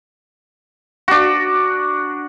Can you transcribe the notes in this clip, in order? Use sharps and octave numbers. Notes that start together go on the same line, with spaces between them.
D4 F#4